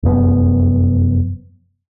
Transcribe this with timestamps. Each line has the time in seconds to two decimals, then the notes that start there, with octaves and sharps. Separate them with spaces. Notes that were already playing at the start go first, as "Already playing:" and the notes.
0.03 F1 F#2 B3